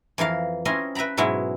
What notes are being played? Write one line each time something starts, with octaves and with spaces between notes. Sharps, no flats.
F2 E3 A#4 F5
C4 C#4 E4 A#4 D#5 C6
B4 E5 G5 A#5 B5
G#2 B2 F#3 G#3 E4